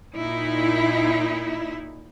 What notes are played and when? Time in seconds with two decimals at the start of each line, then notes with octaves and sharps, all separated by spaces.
0.17 A#2 D#4 E4